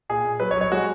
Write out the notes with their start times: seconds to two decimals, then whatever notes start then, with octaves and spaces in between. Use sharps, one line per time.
0.09 A#2 G#4
0.25 A#2
0.40 F#3 B4
0.51 C#5
0.56 F#3
0.61 C#5
0.72 G#3 F#4